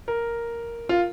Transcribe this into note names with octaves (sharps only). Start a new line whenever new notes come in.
A#4
F4